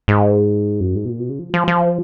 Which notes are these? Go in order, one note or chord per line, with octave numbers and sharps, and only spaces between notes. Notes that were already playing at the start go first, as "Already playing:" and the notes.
G#2
F#2
G#2
B2
A#2
B2
C#3
F3
F3
F3